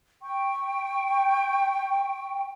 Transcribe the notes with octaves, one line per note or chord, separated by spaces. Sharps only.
G5 C#6